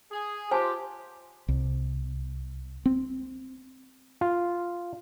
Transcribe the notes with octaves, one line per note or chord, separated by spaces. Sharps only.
G#4
F4 G4 C5 G#5 A5
C2
C4
F4